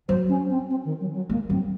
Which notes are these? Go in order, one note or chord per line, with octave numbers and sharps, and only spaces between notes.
F#3 C5
C#4
C4
C4
D#3
F#3
F#3
G#3 A#3
F#3 C4